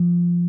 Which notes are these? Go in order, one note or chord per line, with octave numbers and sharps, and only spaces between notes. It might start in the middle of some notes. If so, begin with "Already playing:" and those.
Already playing: F3